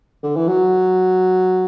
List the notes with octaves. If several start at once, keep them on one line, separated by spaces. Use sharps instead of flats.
D3
E3
F#3